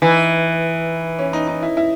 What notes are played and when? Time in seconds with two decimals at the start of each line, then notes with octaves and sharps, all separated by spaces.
0.02 E3 D#4
1.19 C#4
1.33 D#4
1.48 D#4
1.62 E4
1.77 E4